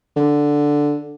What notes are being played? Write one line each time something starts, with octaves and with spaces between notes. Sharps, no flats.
D3